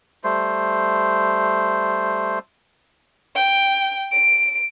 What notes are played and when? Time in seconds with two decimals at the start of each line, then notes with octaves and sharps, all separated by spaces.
0.24 G3 A3 C5
3.35 G5
4.12 D7